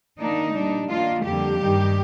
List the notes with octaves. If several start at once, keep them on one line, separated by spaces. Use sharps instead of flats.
D#3 A#3 D4 D#4
A#2 G3 D4
D#3 A#3 D4 F4
F2 D3 G3 A#3 G4
G2 D#3 G3